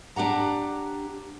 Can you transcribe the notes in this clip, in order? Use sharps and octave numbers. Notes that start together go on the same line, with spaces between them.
D4 G4 F#5 A#5